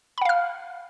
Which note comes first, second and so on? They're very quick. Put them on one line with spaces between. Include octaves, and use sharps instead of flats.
B5 F#5 F5 F6